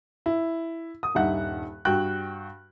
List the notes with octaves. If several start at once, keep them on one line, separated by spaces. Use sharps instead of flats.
E4
D#6
D#1 G2 D#4 E5 F#5 F#6
G2 F#4 G5 F#6